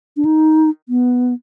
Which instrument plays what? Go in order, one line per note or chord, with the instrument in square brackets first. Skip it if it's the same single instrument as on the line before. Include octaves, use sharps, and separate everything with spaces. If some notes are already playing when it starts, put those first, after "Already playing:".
[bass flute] D4
D#4
B3